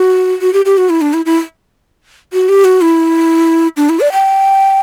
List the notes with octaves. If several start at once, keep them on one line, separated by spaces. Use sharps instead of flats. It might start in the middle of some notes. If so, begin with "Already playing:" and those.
Already playing: F#4
F#4
G4
G4
F#4
E4
D4
E4
E4
F#4
G4
F#4
E4
D4
E4
D5
G5